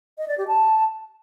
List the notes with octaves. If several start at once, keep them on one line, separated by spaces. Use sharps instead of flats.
D#5
D5
G4
A5